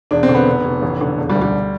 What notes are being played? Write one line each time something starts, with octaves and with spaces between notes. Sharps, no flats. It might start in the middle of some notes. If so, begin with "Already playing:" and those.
E1 D4
C4
D3
B3
F1
F1
A1
D3
E1
G3
D2
G3